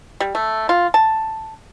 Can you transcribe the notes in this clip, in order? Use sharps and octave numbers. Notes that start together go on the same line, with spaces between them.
G3
A3
F4
A5